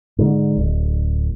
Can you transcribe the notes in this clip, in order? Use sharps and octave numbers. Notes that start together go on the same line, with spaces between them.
G#2 D3
D1